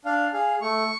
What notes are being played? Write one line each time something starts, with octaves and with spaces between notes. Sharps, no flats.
D4 F5
G#4 F5
A3 C#6